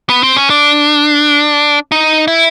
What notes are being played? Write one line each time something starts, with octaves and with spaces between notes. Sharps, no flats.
B3
C4
C#4
D4
D#4
E4